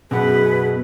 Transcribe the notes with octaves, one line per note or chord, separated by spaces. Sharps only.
F#2 B2 G#4 B4 F#5